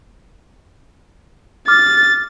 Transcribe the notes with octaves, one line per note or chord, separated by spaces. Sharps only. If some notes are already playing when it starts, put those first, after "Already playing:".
D6 F6 A6